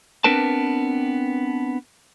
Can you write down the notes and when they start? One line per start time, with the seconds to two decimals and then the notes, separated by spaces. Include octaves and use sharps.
0.24 B3 C4 D4 A#4 B4 A5